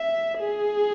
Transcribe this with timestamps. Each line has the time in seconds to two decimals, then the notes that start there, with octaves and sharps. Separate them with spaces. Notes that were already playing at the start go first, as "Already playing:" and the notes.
Already playing: E5
0.38 G#4